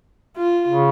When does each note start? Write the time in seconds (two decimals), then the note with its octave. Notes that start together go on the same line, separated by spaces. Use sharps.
0.37 F4
0.68 C#3